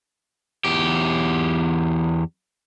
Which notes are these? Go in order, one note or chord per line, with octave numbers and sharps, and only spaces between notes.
E2 G4